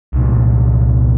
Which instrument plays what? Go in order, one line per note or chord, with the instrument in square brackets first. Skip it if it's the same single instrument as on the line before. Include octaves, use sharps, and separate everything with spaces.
[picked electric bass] C2 A#2 G3